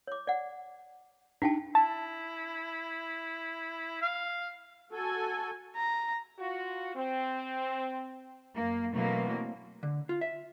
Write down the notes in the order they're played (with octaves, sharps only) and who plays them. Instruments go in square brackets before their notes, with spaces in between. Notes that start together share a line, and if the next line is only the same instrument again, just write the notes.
[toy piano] C#5 D6
D5 F#5
[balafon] D4 D#4 [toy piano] G4 G5 A5
[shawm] E4 [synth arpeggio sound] A5
[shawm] F5
[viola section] F#4 G#5 [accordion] A4
[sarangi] A#5
[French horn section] F4 F#4
C4
[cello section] F#2 A#3
B2 E3 F#3 A3 A#3 C4
[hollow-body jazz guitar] D3
F4
E5